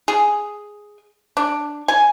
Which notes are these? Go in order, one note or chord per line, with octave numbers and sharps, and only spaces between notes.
G#4
D4
G#5